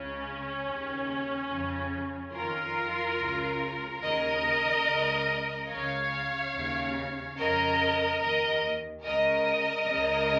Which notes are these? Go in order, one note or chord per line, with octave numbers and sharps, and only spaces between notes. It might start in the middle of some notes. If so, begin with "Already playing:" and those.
Already playing: C#2 C#3 C#4
D#2 C#3
F2 C#3
F2 D#3 F4 A#4
C#2 C#3
D#2 C#3 A#4 D#5
C#2 C#3
C#2 C#3 C#5 F5
D#2 C#3
F2 C#3 A#4 D#5
D#2 D#3 A#4 D#5
C#2 C#3 A#4 D#5
C#2 C#3